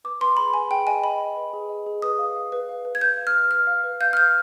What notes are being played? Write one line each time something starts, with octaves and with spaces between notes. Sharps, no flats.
B4 D6
B4 C6
G#4 B5
B4 G#5
G#4 G5
D#5 G#5
D#5 B5
D#5
B4
G#4
D#5
G#4
B4 D#6
F5
F5
B4
F5
B4
G#6
B4 G6
F5
F6
B4
B4 F6
F5
B4
F5 G6
F6
F5 G6